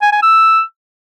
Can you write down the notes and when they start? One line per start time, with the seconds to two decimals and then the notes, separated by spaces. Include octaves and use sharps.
0.02 G#5
0.12 G#5
0.22 E6